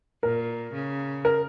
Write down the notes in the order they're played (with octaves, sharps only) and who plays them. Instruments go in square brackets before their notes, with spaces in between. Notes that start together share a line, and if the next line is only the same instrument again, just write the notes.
[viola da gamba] A#2 [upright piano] A#4
[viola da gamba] C#3
[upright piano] A#4